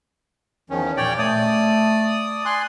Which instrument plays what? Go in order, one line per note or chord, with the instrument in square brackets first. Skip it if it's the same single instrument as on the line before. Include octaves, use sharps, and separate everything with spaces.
[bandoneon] E2 D#3 C#4 [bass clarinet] F3
[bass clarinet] A#2 [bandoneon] C#5 D5 G5
[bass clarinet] A3 [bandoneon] D5 D#6
[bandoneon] G#5 C6 F#6